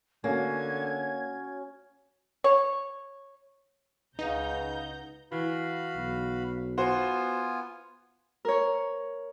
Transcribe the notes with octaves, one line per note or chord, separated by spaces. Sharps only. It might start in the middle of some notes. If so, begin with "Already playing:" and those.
D3 A#3 C#4 F#4 G#6
C#5
C#2 C#3 D#4 B4 F#5 A#5 G6
E3 F#4 F5 B5
B1
B3 F4 F#4 C5 G#5
A#4 C#5